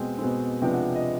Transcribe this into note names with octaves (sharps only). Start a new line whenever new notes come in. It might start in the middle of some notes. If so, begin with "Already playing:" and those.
Already playing: B2 G#3 C4 G5
B2 G#3 C4
C3 F3 G#3 B3 D4 G5
F#5
D#5